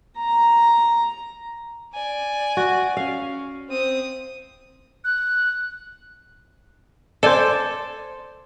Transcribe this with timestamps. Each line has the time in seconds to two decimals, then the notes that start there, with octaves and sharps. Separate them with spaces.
0.17 A#5
1.94 D5 G#5
2.57 F#4
2.97 C#4 F5
3.70 C4 D#6
5.04 F#6
7.23 A4 C5 D5 G#5